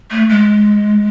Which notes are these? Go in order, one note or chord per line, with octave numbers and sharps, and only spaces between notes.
A3
G#3